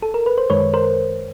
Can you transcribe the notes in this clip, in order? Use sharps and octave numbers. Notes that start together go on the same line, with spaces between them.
A4
A#4
B4
C5
F#2 D#3 G#3 B4 C#5
A#4 C5